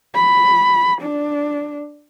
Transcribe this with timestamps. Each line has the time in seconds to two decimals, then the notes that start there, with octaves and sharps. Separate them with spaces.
0.15 B5
1.02 D4